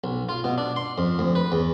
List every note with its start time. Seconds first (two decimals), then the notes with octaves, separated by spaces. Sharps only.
0.04 B1
0.29 F4
0.44 B2
0.58 D4
0.76 C6
0.98 F2
1.19 D2
1.35 B4
1.52 E2